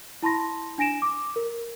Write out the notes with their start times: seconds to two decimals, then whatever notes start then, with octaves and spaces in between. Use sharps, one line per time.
0.23 E4 A5 B5 C6 A#6
0.78 D4 G#5 A#6 D7 E7
1.02 D6
1.36 A#4